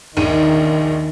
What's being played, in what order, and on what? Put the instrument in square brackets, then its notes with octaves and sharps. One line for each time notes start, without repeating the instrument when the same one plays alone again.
[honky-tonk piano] A#1 D#2 D#7 [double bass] D#3